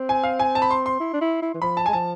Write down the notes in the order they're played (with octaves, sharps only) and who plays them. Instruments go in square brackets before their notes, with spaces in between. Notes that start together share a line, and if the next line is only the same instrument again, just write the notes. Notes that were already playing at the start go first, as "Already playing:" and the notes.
Already playing: [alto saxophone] C4
[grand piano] G#5
F5
G#5
A5
B5
C6
C6
[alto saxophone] E4
D4
E4
E4
E3
[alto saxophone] F3 [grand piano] B5
[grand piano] A5
[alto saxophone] G#3 [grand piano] G#5
[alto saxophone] F3 [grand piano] A5